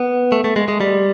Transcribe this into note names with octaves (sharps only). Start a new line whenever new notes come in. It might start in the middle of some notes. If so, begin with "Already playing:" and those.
Already playing: B3
A3
A3
G#3
G#3
G3